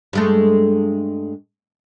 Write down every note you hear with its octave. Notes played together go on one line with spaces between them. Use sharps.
G2 G#3 A3